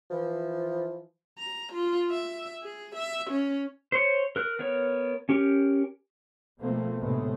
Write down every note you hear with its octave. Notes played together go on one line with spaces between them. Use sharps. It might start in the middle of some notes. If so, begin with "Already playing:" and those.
E3 F3
A#5
F4
E5
G#4
E5
C#4
C5 C#5
A#4 F#6
B3 A#4 C#5
C#4 G4 A#4
B2 F3 A3 A#3 C4
D2 A2 C3 G#3 A3 B3